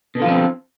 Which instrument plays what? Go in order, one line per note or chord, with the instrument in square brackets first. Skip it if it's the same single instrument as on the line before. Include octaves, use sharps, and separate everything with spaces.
[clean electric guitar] B2
D3
F4
F3
C4